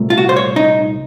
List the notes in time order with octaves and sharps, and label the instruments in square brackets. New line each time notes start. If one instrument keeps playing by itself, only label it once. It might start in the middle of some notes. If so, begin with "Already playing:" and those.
Already playing: [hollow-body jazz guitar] C2 A#2 A3
F4
F#4
C5
C#5
D#4